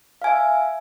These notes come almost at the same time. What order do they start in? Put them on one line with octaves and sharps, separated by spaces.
F5 G#5 E5